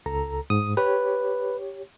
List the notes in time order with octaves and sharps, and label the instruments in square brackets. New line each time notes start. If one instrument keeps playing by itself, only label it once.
[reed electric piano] C#2 A4 A#5
[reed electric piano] G#2 [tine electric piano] D#6
[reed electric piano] G4 C#5 [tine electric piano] B4